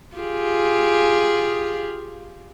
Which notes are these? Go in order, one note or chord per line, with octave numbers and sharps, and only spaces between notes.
F4 G4 G#4